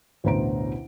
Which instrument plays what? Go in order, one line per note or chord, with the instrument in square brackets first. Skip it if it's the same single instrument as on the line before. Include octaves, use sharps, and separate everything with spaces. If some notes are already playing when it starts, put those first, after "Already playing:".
[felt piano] A1 D2 B2 C5 A#5 D7